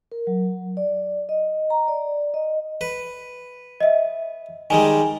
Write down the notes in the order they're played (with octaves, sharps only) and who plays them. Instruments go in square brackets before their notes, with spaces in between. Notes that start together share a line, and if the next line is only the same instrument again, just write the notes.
[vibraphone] A#4
F#3
D5
D#5
A#5
D5
D#5
[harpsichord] B4
[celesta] D#5 E5
[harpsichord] D#3 G3 G#3 [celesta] G#5